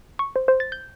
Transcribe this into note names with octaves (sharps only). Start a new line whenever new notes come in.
C#6
C5
C5
A6
G6